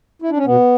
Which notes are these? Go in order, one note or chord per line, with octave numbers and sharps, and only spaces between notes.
E4
D4
C#4
B2 B3